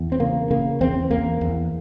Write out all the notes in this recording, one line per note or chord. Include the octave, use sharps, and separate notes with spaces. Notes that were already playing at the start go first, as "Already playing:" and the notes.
Already playing: E2
C4
C#3 A#3
C#3 A#3
E2 C4
E2 A#3
E2